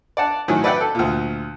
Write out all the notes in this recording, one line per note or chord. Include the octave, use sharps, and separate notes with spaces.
D5 F#5 A5
A2 D#3 F#3 G#5
B4 D5 E5 F#5 G5 B5
A4
D2 A#2